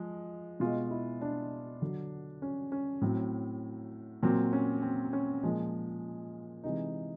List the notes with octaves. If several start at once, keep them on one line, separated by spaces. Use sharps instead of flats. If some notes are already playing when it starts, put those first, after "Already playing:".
Already playing: F3 G#3
B2 G#3 F4
E4
D4
D3 F#3
C#4
C#4
A2 F#3 C4
A#2 F#3 C4
C#4
C4
C#4
A#2 F3 G#3
C3 E3 G#3 D#4